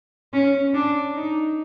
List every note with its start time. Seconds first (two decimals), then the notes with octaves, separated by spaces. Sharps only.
0.33 C#4
0.74 D4
1.16 D#4